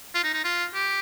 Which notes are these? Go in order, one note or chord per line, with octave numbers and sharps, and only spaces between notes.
F4
D#4
D#4
F4
G4